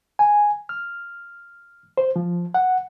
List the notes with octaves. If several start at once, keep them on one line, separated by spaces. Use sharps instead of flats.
G#5
F6
C5
F3
F#5